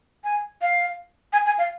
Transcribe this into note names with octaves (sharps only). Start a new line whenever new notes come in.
G#5
F5
G#5
G#5
F5